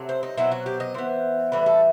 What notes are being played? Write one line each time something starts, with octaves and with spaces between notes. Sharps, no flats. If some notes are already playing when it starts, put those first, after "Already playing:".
Already playing: C3 F#3 A3 C4
C5
D#4
B2 F#3 C4 E4
F#4
G4
D#5
E3 B3 C5
A2 E3 G3 B3 B4
A4